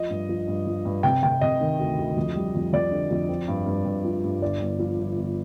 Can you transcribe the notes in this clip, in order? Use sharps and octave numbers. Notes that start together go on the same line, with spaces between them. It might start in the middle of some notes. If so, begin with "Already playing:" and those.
Already playing: F3 D#5
G2
F3
G2
F3
G2
C3 G5
C3 G5
C3 D#5
D#3
D2
D2
F2
G3
F2
F2 D5
D3
F2
C4
G2
G2
G2
F3
G2
G1 D5
G1
F3
G1
G1